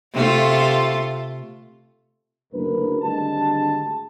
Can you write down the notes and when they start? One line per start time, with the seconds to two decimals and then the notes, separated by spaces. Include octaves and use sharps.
0.14 C3 A3 F4
2.53 F#1 D2 A#4 B4
3.02 G#1 D2 D3 G3 G#3 A5